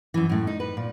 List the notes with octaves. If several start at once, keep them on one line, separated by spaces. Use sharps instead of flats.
F#2 E3
F#2 A2
D#4
B4
A#2